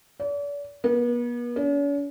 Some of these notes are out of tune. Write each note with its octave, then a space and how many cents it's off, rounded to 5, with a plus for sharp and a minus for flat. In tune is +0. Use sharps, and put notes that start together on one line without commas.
D5 -40
B3 -40
C#4 +45